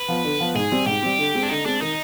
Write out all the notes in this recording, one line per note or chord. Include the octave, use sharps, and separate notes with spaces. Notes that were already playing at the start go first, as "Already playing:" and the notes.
Already playing: B4
F3 B3
D3
F3 B3
G#2 G#4
G3 C4
G#2 G4
G3 C4
D3
G#3 C4
D4
D3 D#4
G#3 C4 D4
D#3 D#4